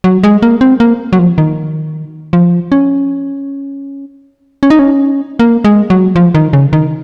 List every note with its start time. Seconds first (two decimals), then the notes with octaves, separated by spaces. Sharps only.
0.04 F#3
0.23 G#3
0.42 A#3
0.61 C4
0.80 A#3
1.13 F#3
1.19 F3
1.38 D#3
2.33 F3
2.72 C#4
4.63 C#4
4.70 D#4
4.79 C#4
5.39 A#3
5.64 G#3
5.90 F#3
6.16 F3
6.35 D#3
6.53 C#3
6.73 D#3